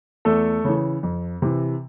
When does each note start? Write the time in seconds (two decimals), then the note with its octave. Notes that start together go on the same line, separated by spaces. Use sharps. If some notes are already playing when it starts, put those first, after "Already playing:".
0.25 E2 A3 A4
0.65 C#3 E3
1.03 F2
1.42 C3 E3